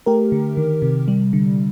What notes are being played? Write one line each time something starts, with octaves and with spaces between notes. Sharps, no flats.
A3 G4 A#4
D3
D#3
C3
G3
D3